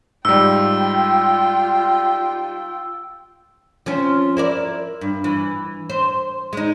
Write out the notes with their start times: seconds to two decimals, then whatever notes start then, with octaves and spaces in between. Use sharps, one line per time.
0.25 G#2 G3 F4 G5 E6
3.86 F3 C4 C#4
4.37 E4 A#4 D5
5.01 G2
5.24 E3
5.90 C5
6.53 G#3 D#4